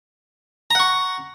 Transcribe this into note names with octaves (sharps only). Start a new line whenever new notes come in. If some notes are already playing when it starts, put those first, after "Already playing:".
F#5 A#5 C#6